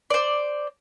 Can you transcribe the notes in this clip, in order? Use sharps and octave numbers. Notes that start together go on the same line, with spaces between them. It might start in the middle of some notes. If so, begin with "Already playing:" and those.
C5 D5